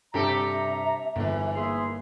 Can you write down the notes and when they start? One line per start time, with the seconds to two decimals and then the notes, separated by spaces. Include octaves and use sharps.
0.14 G2 C3 G4 A4 E5 A#5
1.16 G1 G#2 E3
1.56 A#3 G#4 E5 C6